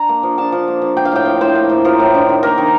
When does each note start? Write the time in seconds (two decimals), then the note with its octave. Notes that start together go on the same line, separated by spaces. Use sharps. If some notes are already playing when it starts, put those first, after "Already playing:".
Already playing: D4 A#5
0.09 A#3
0.23 F3
0.38 D4 A5
0.52 F3
0.68 A#3
0.81 F3
0.97 A#3 G5
1.05 F5
1.12 A2 G5
1.25 F3
1.41 A2 C5
1.55 A#3
1.70 A2
1.85 F3 A#4
2.00 A2
2.15 D4
2.29 D#3
2.43 A#3 A#4
2.58 D#3